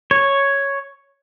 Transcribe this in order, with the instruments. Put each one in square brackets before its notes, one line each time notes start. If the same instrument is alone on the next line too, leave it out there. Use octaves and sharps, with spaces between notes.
[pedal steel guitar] C#5